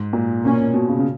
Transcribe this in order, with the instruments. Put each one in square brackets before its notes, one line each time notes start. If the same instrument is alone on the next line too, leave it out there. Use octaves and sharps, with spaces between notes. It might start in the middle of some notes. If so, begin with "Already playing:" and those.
Already playing: [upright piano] G#2
A#2
[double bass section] B2 A#3 C#4
[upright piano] B2
C#3
C#3